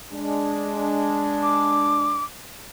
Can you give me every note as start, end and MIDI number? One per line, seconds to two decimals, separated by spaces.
0.12 2.21 56
0.12 2.21 62
1.42 2.24 86